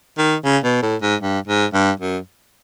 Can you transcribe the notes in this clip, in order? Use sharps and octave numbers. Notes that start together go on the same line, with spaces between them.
D#3
C#3
B2
A2
G#2
G2
G#2
G2
F#2